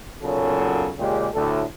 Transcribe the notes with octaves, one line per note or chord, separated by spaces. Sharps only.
B1 F#2 A#2 C#3 F#3 A4
A#2 C#3 G#3 G4
D2 A2 A4